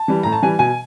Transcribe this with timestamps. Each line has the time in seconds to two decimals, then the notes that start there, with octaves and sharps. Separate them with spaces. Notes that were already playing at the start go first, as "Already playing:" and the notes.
Already playing: A5
0.08 E3 G3
0.23 A2 A#5
0.32 A5
0.42 E3 G3 G#5
0.59 B2 G#5